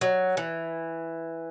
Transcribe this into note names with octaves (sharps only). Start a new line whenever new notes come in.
F#3
E3